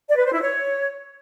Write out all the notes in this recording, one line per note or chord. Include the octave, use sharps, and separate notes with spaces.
D5
B4
C5
E4
C#5